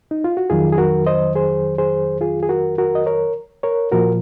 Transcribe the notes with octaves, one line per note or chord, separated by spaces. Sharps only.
D#4
F4
F#4
F2 D#3 F#3 F4 G#4
G#4
F#4 A#4
C5 D#5
G#4 C5
G#4 C5
F4 G#4
G#4
F#4 A#4
F#4 A#4
D#5
A#4 C#5
A#4 C#5
A#2 F3 F#4 A#4